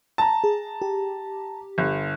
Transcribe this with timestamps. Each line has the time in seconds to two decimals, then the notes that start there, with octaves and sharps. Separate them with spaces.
0.18 A5 A#5
0.44 G#4
0.82 G4
1.78 G1